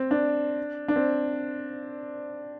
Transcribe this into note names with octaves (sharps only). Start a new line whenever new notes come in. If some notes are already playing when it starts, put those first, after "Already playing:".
Already playing: C4
D4
D4
C4